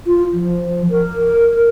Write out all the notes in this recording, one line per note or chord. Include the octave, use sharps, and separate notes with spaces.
F4
F3
A#4